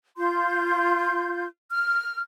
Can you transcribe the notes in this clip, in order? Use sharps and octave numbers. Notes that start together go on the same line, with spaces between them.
F4 C6 G6
F6